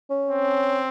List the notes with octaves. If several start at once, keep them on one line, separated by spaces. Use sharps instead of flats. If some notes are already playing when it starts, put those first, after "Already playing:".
C#4
C4